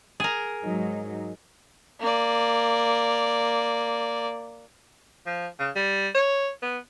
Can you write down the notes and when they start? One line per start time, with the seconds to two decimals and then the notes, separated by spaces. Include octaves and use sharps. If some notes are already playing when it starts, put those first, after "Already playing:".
0.20 G#4 A#4
0.63 G#2 F#3 D#4
2.00 A#3 D5
5.26 F3
5.59 C#3
5.76 G3
6.15 C#5
6.62 B3